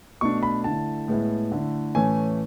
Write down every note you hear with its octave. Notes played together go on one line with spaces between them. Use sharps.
B2 A3 D4 C#6
B5
D3 A3 E4 A5
A2 G#3 B3 E4
D3 A3 E4
A2 E3 A3 C#4 G#5